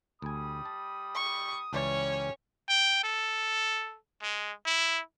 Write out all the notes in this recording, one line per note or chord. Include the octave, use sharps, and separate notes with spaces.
D2 G3 G#5 B5 D#6
A5
C#6
C#2 E3 G3 C#4 C#5 D5
G5
A4
G#3
E4